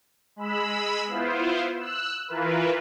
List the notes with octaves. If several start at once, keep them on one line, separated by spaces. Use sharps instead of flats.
G#3 B5 E6
B3 E4 F4 C5
E6 F#6
E3 E4 F4 A#4 B4